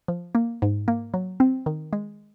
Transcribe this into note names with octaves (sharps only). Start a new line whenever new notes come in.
F3
A#3
G#2
A#3
F#3
C4
D#3
G#3